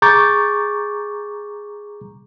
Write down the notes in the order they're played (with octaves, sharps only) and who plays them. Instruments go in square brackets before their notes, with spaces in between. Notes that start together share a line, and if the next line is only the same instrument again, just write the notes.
[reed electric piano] G#4 A#5 C#6 D6 G6 A6